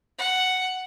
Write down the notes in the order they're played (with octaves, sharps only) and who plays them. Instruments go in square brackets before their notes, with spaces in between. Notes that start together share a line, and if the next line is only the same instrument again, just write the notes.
[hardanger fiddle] F#5